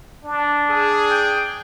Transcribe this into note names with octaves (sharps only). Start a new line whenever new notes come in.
D4
G#4
G5